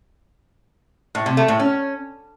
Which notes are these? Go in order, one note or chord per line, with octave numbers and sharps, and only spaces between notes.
A2
C3
A3
A2
C#4